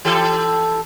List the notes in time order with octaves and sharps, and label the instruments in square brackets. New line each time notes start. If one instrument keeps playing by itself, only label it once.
[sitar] E3 G4 A4